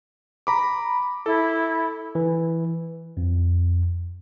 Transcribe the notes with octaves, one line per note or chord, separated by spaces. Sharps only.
A#5 B5 D6
E4 A4
E3
F2